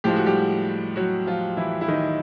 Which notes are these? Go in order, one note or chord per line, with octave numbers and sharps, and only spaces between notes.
A2 F3 G#3 G4
F#4
G3 G4
F#3 F#4
F3 F4
E3 E4
E4
D#3 D#4